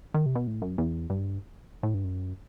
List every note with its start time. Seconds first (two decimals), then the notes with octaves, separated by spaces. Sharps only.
0.14 D#3
0.26 C3
0.35 B2
0.47 A2
0.62 F#2
0.78 E2
1.10 G2
1.83 A2
1.94 G2
2.04 F#2